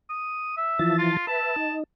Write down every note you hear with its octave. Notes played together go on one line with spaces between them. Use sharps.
D#6
E5
E3 F3 A5
F4
B4 E5 A5
D#4